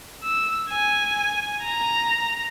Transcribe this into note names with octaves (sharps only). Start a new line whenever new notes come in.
E6
G#5
A#5